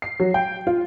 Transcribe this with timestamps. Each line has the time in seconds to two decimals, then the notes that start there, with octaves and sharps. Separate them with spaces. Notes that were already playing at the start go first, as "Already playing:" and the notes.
0.02 C7
0.20 F#3
0.34 G5
0.67 F4